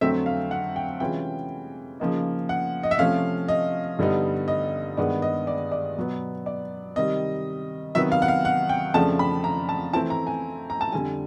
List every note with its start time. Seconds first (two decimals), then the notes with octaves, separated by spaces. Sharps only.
0.01 F2 D3 F#3 A3 C4 E5
0.26 F5
0.51 F#5
0.76 G5
1.00 C3 E3 G#3 C#4 F4 G5
2.00 C#3 F3 A#3 D#4
2.49 F#5
2.83 D#5
2.91 E5
2.99 C3 F3 A3 C#4 F5
3.48 D#5
3.99 G2 D3 G3 B3 D#4
4.48 D#5
4.97 G2 D#3 G#3 B3 D5
5.22 D#5
5.47 D5
5.72 D5
5.97 B2 F#3 B3
6.46 D5
6.96 C3 D#3 G3 D#5
7.95 C3 D#3 F#3 B3 E5
8.12 F5
8.22 F#5
8.28 F5
8.45 F#5
8.69 G5
8.94 F2 C#3 F3 A3 D4 A5
9.19 B5
9.44 A#5
9.69 A5
9.93 E3 A3 C4 E4 A5
10.10 A#5
10.27 G#5
10.70 A#5
10.81 A5
10.92 F2 D3 G3 G#5